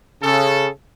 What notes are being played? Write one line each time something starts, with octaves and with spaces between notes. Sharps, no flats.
C#3 A4